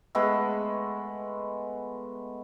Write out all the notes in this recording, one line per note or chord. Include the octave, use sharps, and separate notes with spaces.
G#3 A3 B3 A4